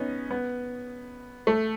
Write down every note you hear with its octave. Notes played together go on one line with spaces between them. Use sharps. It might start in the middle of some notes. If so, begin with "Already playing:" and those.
Already playing: B3 C#4 D#4
B3
A3